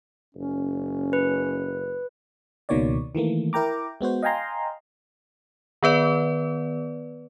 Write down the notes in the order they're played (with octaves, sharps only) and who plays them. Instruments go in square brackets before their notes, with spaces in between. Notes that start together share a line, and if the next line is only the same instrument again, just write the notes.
[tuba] F#1 [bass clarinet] C#4
[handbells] B4
[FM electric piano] C#2 B2 D#3 A#3 C#5 D5
D#3 E3 A3 A#3
E4 A#4 G5 A#5 D6
G#3 B3 F#4 C5
D#5 F5 G5 G#5 A#5 C6
[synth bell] D#3 B3 B4 D5